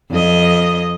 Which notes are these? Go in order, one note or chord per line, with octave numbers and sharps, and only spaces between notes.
F2 D#5